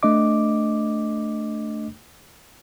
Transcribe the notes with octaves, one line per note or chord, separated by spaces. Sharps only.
A3 D4 D#5 D6